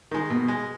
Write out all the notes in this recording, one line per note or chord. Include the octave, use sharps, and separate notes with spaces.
D#3 G#3
B2
G#3